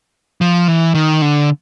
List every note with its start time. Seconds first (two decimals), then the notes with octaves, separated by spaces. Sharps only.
0.41 F3
0.68 E3
0.95 D#3
1.22 D3